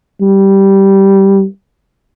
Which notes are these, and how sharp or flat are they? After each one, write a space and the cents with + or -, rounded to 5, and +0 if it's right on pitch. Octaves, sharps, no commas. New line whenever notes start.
G3 -10